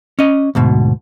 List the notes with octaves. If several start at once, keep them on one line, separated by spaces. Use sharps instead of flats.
C#4 D#5
D2 G#2 B2